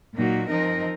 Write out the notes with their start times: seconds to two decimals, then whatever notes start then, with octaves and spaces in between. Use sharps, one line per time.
0.14 A#2 F#3 A#3 D#4 F#4
0.48 F3 C4 D#4 A#4 D#5